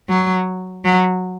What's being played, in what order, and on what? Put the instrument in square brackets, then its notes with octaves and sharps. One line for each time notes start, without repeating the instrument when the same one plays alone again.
[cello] F#3
F#3